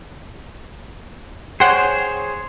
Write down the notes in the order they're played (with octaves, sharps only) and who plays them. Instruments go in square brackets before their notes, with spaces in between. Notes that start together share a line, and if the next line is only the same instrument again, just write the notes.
[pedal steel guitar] G#4 C5 C#5 [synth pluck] F#5 G5 C6